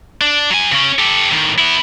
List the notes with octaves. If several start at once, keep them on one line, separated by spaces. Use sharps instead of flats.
D4
F#3 G#5
C#3 C#4
G4 A4
A2 D#3
B3 E4